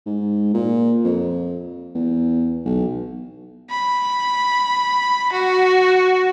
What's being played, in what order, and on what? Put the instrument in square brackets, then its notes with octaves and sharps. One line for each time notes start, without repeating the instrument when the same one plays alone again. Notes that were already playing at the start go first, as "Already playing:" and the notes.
[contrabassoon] G#2
A#2
F2
E2
B1
[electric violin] B5
F#4